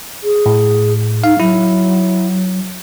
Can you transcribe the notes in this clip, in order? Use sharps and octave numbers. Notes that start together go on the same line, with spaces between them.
G#4
A2
D#4 F5
F#3 E4